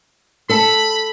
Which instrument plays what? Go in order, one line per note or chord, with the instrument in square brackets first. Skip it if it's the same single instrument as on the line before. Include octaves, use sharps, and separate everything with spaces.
[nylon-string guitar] A4 A5 [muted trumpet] B5